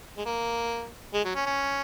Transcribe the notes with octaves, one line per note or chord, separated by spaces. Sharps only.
G#3
A#3
G#3
F#3
C#4
C#4